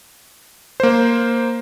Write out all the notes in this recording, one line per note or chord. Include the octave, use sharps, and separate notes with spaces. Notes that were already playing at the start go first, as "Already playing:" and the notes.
A#3 C5